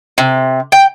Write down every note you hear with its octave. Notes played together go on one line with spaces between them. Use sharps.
C3
G5